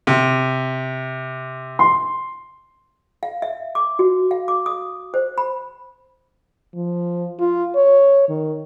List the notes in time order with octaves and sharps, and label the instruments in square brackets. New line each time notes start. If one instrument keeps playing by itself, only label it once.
[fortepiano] C3
[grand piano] C6
[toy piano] F5
E5
D6
F#4
F5
D6
D#6
C5
B5
[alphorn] F3
F4
C#5
D#3